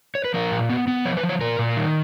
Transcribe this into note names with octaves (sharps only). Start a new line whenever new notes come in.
C#5
B4
F3 A#4
A#2
B3
B3
F3 C#5
B4
F3
C#5
A#2 A#4
A#2
D#3